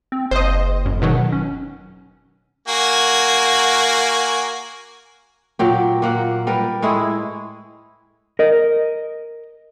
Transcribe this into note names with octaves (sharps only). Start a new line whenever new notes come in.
C4
F#1 C5 D#5
F#2
B2 D#3 F#3
C#4
A#3 F#4 G#5
A#2 F#3 G4
A#2 A#3 F#5
G3 A#4 B4
A2 G#3 E4 G#4
A#4 D#5